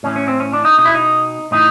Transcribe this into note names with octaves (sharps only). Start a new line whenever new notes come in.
A2 E3 C#4
C#4
C4
C#4
D4
D#4
B2 D#4
E4
D#4
A2 E3 D#4